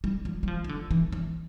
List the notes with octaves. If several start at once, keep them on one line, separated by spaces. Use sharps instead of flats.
G3
F3
G3
F3
E3
D3
E3
E3